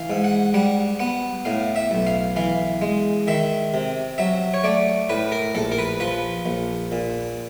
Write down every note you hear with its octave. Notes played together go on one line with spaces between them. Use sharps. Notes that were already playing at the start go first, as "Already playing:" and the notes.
Already playing: E3 F5
G#2
F#5
G3 F#5
B3 F#5
A2 F5
E5
B1
F5
E3 F5
G#3
D#3 E5
C3
F#3 E5
C#5
A3 D5
A2 B4
A#4
A#1 A4
A#4
B4
F3 B4
A#1
A#2